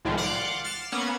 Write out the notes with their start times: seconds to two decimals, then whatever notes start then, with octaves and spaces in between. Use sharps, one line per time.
0.05 C2 A2 D#3 F3 G#3
0.17 D5 F5 F#5 C6 D6
0.64 F6 A6 C7 E7
0.92 A#3 B3 C#4 F#5 G#6